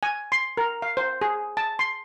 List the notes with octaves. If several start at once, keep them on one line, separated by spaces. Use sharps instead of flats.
G#5
C6
A#4
F5
C5
G#4
A5
C6